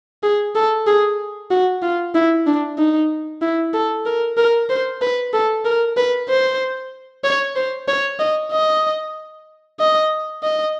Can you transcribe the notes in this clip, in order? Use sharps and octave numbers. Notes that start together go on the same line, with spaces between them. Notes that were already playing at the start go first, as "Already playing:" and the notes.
G#4
A4
G#4
F#4
F4
E4
D4
D#4
E4
A4
A#4
A#4
C5
B4
A4
A#4
B4
C5
C#5
C5
C#5
D#5
D#5
D#5
D#5